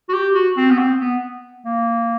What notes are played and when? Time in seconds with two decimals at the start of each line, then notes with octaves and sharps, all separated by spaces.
0.09 F#4
0.13 G4
0.35 F#4
0.57 C4
0.70 B3
0.78 C4
1.00 B3
1.65 A#3